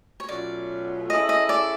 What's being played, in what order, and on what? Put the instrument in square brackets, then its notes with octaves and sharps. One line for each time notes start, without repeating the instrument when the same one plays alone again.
[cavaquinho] C#5
[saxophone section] B2 F#3 A3 C#4 F4 [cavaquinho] D5
[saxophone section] G#3 C#4 E4 A4 [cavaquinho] D#5
[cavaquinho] D#5
D5